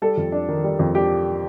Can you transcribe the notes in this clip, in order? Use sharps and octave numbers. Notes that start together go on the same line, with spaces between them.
G3 A4
F2
D4
D#3
G3
F2
D4 G4